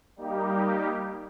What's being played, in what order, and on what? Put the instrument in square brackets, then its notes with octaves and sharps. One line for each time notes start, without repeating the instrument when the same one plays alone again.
[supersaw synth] G3 A#3 D#4 G4